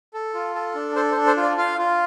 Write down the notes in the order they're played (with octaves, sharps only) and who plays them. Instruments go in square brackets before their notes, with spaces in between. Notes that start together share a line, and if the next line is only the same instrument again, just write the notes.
[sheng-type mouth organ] A4
F4
A4
D4
A4 C5
C5
D4
C5
F4
D5
F4 F5
F4